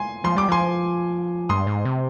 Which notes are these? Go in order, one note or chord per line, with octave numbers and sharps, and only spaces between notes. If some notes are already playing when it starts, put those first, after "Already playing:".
Already playing: G#5 C6
F3 C6
G3 D6
F3 G#5 C6
G2 C6 D#6
G#2
C3